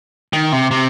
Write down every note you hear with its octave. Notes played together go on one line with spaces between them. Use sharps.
D#3
C3
C3